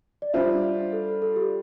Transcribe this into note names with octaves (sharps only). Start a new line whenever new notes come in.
D5
G3 D4 F4 C5 E5
A4
A4
G4